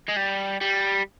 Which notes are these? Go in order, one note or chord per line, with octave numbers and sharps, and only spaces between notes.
G#3
G3
G3